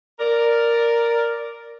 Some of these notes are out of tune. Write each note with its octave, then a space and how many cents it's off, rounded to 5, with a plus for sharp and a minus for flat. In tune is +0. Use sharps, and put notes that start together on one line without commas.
A#4 +0 D5 +0